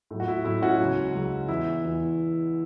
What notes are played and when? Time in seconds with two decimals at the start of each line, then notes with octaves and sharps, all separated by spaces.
0.11 A2 F#3
0.20 F#4
0.28 E4
0.44 A2 F#3 E4
0.62 C#4 F#4
0.80 C#2 C#3 F#3
1.14 C#2 C#3 F#3
1.48 E2 E3 E4
1.83 E2 E3